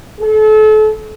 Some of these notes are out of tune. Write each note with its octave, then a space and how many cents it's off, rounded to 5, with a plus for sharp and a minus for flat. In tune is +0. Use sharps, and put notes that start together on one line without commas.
A4 -35